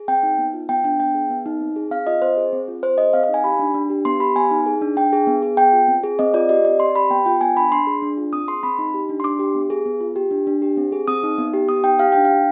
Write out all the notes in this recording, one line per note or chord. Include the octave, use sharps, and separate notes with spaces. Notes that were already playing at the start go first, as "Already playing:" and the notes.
Already playing: G#4
C4 G5
D#4
B3
F4
B3 G5
D4 G5
B3 G5
G#4
B3
D#4
C4
G#4
C4 F5
F4 D#5
C4 C5
G#4
C4
F4
C4 C5
G#4 D#5
C4 F5
F5
D#4
G#5
G4 B5
D4
D4
G4
B3 C6
G4 B5
B3 G#5
D#4
G#4
D4
D4 G5
G#4
B3
G#4
B3 G5
F4
C4
G#4
C4 D#5
F4 D5
G4 D#5
C4 D5
C4 C6
G4 B5
B3 G5
F4 G5
B3 G#5
D4 B5
D4 C6
G#4
D4
F4
C4 D#6
G#4 C6
C4 B5
D#4
G4
D4
C6
D4 D6
G4
B3
G#4
B3
F4
G4
D4
D4
G4
C4
G#4
C4 D#6
D#4
B3
G4
B3 D#6
D#4 G5
G4 F5
D4 G5
D4 F5